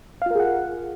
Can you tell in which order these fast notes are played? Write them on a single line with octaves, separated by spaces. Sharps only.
F5 F4 A#4 G#4 F#5